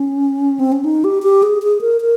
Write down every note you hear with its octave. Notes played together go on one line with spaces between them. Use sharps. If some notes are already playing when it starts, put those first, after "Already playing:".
Already playing: C#4
C4
C#4
D#4
G4
G4
G#4
G#4
A#4
A#4